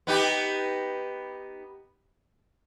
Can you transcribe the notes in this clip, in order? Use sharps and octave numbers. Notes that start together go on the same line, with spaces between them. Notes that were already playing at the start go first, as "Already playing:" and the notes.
B3 D#4 G4